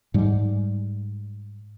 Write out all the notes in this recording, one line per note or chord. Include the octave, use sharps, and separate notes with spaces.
G#2 G3